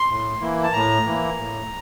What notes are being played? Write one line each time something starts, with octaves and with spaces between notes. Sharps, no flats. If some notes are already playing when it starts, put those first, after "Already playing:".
Already playing: C6
A2
E3 A#3 E4
A5
A2 A#5
E3 A#3 E4
A2